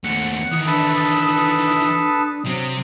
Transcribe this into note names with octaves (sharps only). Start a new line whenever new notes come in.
D#2 A3 F#5
D#3 E3 D#6
D4 A4 B4 A5
C3 F#3 C4